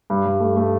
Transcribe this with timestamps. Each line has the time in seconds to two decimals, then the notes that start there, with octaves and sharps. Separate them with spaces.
0.10 G2
0.25 G2
0.40 A3
0.57 A3